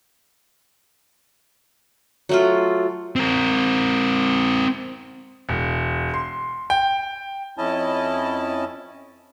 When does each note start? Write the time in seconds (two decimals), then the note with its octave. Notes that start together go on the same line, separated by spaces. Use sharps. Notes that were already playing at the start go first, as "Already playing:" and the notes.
2.29 F#3 A3 F4
3.16 C4 A#4
5.49 E1
6.14 C6
6.70 G5
7.58 F2 C#4 E4 D#5 A5